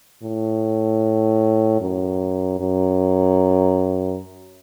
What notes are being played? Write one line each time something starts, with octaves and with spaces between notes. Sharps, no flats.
A2
F#2
F#2